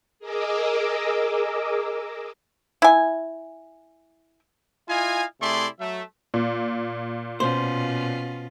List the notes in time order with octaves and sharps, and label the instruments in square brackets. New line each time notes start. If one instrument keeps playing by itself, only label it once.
[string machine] G#4 A#4 D#5 D6 E6
[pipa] E4 G#5
[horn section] E4 F4 D#5 F5 G#5
C3 A3 E4 G#4 D5 C6
F#3 A3 E5
[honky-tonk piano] A#2
[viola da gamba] B2 C#4 F4 [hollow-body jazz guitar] C5